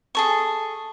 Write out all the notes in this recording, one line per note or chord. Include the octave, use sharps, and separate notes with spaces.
G#4 A4 C#6